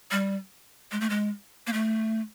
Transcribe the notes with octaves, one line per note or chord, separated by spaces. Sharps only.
G3
G#3
A3
G#3
A#3
A3